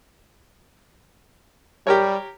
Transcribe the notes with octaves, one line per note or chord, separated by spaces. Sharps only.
G3 G4 A#4 C#5